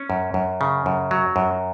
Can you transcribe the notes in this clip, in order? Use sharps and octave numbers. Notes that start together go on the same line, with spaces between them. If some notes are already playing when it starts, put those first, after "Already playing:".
Already playing: C#4
F#2
F#2
C#3
F#2
F#3
F#2